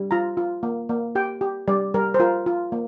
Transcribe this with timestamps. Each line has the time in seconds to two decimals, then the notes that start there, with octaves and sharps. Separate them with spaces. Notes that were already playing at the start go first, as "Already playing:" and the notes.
Already playing: G3
0.11 F4 A#5
0.37 F4
0.63 A#3
0.89 A#3
1.15 G4 G5
1.41 G4
1.68 G3 D5
1.94 G3 A#4
2.14 C5
2.20 F4 A#4
2.46 F4
2.72 A#3